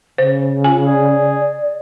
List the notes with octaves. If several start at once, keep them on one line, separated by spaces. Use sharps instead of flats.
C#3 C5
F4 G#5
G#4 D5